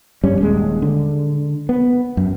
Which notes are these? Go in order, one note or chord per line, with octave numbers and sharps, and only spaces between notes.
G2 G3 C#4
D#1 G#3
D3
B3
F#2